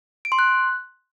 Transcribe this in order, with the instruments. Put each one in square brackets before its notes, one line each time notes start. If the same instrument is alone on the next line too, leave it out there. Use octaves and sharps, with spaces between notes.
[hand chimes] D7
C6
F#6